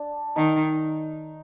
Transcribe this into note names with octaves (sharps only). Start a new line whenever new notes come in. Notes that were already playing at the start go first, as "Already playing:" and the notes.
Already playing: D4
D#3 D#4